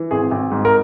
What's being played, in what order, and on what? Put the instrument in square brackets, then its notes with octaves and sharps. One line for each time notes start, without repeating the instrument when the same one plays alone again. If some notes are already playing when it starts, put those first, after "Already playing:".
Already playing: [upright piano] E3
G#1 G#4
G#1
G#2
A#4